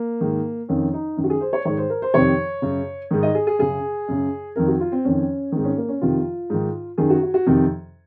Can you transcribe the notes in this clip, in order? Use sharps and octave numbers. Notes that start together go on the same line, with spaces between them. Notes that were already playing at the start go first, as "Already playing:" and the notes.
Already playing: A#3
G#2 D#3
F2 D#3 C#4
D#4
F#2 D#3
F#4
G#4
C5
C#5
G#2 D#3 C#5
C5
A#4
C5
F2 C3 D#3 C#5
F#2 C#3
G#2 D#3
D#5
G#4
G#4
F#2 C#3 G#4
F#2 C#3
F2 D#3 A#4
F#4
F4
C4
F2 D#3 C#4
G#2 D#3 C4
C#4
A#3
C#4
F2 C3 D#3 F4
G#2 D#3
F#2 D#3 G#4
F#4
F#4
F#4
F2 C3 D#3